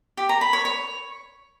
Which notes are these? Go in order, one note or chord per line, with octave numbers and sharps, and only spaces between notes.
G4
A#5
B5
C#5
C#5